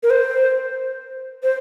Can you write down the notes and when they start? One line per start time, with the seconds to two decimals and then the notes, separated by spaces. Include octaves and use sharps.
0.03 A#4
0.10 C5
1.43 C5